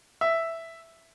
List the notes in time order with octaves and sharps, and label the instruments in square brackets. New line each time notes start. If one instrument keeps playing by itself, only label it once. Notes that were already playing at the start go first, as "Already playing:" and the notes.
[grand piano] E5